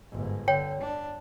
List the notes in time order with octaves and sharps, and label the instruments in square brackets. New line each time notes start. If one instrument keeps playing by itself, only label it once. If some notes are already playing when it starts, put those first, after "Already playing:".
[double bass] G1 G#2
[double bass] D3 [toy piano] C#5 G5
[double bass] D4